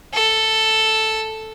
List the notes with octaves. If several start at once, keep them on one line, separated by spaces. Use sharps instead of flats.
A4